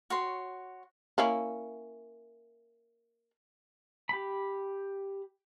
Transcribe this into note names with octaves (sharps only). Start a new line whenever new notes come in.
F#4 C#5 C6
A#3 C#4 E4
G4 B5